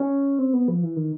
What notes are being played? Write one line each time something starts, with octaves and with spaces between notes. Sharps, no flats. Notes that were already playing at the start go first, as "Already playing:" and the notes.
Already playing: C#4
C4
B3
F3
E3
D#3